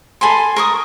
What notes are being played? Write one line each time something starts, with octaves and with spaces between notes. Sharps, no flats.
A4 G#5 B5 C6
A#4 C#6 D#6